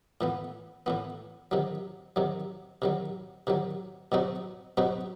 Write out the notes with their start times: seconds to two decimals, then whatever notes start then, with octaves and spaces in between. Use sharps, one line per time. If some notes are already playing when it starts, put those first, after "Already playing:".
0.21 A2 E3 B3
0.86 A2 E3 B3
1.51 C3 D#3 F#3
2.16 C3 D#3 F#3
2.82 C3 D#3 F#3
3.47 C3 D#3 F#3
4.12 B2 F#3 C4 D#4 F#4
4.77 B2 F#3 C4 D#4 F#4